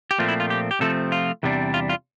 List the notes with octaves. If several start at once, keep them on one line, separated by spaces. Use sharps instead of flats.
G4
A#2 F3 A3 C4 F4
E4
F4
G4
G4
C3 F3 A3 C4 A4
F4
E2 C3 G3 D4
F4
F4